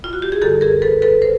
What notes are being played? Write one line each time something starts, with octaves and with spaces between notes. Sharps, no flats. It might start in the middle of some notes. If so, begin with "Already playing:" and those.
F4
F#4
G4
G#4
F#2 D3 G3 G4 A4
G#4 A#4
A4 B4
A4 B4
A#4 C5